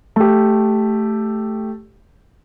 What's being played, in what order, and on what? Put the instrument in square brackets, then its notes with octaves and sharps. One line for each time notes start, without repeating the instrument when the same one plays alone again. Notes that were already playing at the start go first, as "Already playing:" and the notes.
[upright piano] A3 G4